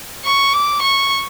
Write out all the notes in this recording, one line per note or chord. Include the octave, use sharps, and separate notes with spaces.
C#6
D6
C#6